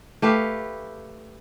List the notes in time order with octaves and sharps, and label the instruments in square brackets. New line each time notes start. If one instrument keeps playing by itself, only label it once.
[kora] A3 G4 B4 F5